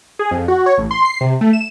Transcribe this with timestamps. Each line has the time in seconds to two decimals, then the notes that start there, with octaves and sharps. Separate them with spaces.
0.19 G#4
0.31 F2
0.48 F#4
0.66 C#5
0.78 A1
0.91 C6
1.05 C7
1.21 C3
1.41 A3
1.53 E7